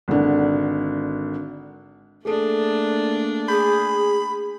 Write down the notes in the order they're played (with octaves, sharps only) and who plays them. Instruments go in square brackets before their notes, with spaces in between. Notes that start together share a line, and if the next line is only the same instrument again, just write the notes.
[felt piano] G#1 D3
[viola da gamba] A3 A#3 D4 [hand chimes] G#4 A4
[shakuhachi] G#4 [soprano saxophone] B5 [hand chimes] G6